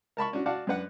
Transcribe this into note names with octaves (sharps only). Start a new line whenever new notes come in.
A#4 A5 B5 C#6
C#4 D4 F#4
F#4 D5 F5 F#5 A5
F#2 D4 B4 F#5